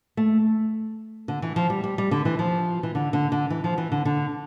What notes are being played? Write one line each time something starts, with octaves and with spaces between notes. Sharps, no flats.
A3
D3
E3
F3
G3
G3
G3
D3
E3
F3
E3
D3
D3
D3
E3
F3
E3
D3
D3